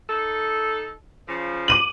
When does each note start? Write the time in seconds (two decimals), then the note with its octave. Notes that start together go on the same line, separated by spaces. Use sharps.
0.09 D#4 A4
1.28 C#3 F3
1.68 D6 D#7 F#7